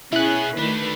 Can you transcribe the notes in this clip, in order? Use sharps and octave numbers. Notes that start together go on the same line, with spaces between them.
B2 B3 C#4 E4 G#4 F#6
D2 D#3 A3 D4 B4